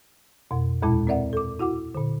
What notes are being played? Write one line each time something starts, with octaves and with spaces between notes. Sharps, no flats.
F2 B2
D#2 A#2 G#3 E4 A5
C4 A#4 D5 E5 F#5
A4 D6
E4 F#4 F#5 D6
A#2 D3